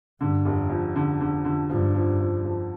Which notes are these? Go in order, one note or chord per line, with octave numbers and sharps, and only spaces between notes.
G2 D3
F1
F2
D3
D3
D3
G2 F3
F3
F3
F3